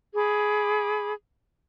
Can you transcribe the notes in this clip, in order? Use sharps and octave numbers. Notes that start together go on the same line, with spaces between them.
G#4 B5 D6